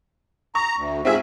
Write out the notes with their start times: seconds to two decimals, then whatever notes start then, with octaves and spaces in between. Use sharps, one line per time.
0.55 A#5 C#6
0.76 D2
1.05 G#2 C4 F4 G#4 E5